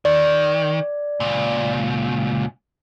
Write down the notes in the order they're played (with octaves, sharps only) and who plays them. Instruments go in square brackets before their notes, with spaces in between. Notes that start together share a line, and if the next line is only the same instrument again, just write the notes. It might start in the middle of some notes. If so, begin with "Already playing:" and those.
[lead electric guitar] D#3 [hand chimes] D5
[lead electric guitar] C#2 A#2